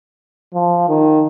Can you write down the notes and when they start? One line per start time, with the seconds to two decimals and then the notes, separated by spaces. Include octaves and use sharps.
0.54 F3
0.89 D#3